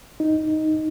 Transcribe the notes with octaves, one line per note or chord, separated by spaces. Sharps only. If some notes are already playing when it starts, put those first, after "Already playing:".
D#4